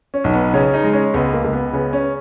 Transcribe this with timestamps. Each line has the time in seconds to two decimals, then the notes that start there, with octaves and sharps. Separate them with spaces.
0.14 C#4
0.24 B1
0.34 B3
0.53 C#3 C#4
0.74 D#4
0.84 G#3
0.93 C#4
1.14 C#2 B3
1.34 A#3
1.44 C#2
1.53 B3
1.73 C#3 B3
1.93 C#4